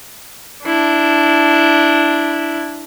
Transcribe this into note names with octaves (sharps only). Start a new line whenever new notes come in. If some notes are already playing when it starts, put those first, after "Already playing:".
D4 E4